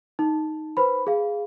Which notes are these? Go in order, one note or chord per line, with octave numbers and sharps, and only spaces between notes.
D#4
B4 C5 B5
G#4 F5